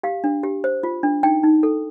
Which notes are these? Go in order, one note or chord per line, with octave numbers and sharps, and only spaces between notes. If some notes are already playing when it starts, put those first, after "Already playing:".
G4 F5
D4
G4
C5
F4
D4
D#4 G5
D#4
A4